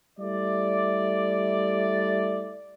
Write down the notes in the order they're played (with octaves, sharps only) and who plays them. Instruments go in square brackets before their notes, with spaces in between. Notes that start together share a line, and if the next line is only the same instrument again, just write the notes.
[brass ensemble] G3 A3 E4 D5